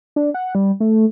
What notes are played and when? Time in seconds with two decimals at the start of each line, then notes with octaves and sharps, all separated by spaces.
0.16 D4
0.34 F#5
0.55 G3
0.80 A3